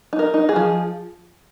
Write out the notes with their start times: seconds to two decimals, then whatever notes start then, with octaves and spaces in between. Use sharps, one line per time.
0.13 D#4
0.19 A#4
0.34 D#4
0.49 G#4
0.56 F3